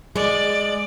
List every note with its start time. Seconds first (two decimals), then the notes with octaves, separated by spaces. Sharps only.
0.16 G#3 D5